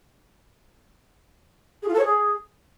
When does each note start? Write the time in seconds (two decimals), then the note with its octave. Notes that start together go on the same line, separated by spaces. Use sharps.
1.82 G#4
1.87 F4
1.93 A4
1.98 C#5
2.04 G#4